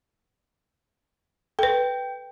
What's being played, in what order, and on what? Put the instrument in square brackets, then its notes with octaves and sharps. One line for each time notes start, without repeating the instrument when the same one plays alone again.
[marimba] A4 B4 [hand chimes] G5